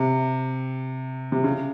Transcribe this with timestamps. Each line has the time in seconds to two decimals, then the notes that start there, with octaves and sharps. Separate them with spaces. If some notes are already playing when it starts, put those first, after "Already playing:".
Already playing: C3
1.32 C3
1.44 C#3